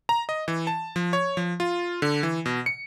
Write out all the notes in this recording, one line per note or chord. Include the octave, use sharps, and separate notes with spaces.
A#5
D#5
E3
A5
F3
C#5
F3
F4
D3
E3
B2
C#7